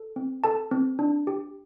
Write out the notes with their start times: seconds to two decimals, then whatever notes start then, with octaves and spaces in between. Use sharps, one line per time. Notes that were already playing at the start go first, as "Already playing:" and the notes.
Already playing: A4
0.16 C4
0.44 A4 A5
0.71 C4
0.99 D4
1.27 G4